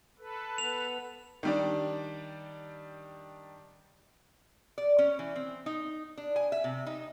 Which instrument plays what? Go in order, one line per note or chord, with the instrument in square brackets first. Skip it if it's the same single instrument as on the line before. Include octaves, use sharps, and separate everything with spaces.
[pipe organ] A4 B4
[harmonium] B3 [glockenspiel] F7
[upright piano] D#3 G3 D4
[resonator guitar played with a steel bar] D5
C#4
E3
C4
D#4
D4
G#5
E5
C3
D#4